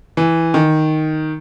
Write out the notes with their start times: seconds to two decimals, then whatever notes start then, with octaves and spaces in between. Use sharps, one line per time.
0.17 E3
0.54 D#3